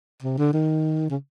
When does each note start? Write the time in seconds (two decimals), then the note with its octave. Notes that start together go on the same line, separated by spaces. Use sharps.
0.22 C3
0.38 D3
0.53 D#3
1.10 C#3